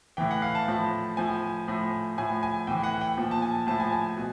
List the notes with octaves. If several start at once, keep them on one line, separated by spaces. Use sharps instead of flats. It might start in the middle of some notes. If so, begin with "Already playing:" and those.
A2 E3 G5
F#5
F5
A5
A2 F3
A2 F3 G#5
A2 F3
A2 F3 G#5
G#5
A2 E3 G5
F#5
G5
A#2 F3
A5
G#5
A2 F3 A5
G#5
G#5
B2